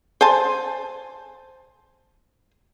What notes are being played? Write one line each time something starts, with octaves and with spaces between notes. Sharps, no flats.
C5 G#5 A5